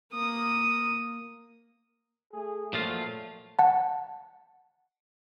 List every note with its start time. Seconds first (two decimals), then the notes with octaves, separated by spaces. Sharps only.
0.13 A#3 D#6
2.33 A3 G#4
2.73 A#2 F3 F#3 A3 F4
3.59 F#5 A5